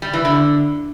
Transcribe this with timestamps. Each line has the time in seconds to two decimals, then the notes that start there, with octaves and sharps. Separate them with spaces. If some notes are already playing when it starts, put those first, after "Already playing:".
0.02 G3
0.13 E3
0.25 D3